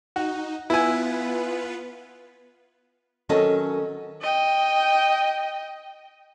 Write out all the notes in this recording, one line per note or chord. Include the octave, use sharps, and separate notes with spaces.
D#4 F#4
B3 E4 F4 B4 G#5
D#3 F#3 C#4 A4 D#5 A5
D#5 G5